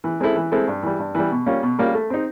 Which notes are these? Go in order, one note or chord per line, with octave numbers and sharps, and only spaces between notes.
E3
G#3 C4 E4 A4
E3
G#3 C4 E4 A4
G2
E3 G3
G2
E3 G3
B2
G3 A#3 C#4 F4
B2
G3 A#3 C#4 F4
A3
C4 D#4